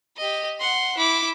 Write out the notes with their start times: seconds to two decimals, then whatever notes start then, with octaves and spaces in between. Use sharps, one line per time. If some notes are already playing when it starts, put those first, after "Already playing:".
0.17 G4 D#5
0.60 F#5 C6
0.98 E4 D6